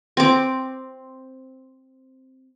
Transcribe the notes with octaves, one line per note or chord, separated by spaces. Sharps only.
C4 D6